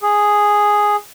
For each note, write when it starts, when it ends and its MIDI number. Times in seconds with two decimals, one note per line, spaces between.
0.02 0.96 68